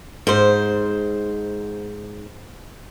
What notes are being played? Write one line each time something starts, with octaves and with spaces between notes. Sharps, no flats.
G#2 C5